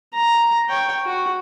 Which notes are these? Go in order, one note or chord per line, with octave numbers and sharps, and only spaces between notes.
A#5
C#5 G5
F#4